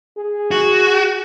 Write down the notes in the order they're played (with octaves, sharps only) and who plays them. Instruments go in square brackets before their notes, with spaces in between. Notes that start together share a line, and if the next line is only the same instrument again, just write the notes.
[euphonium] G#4
[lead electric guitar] F#4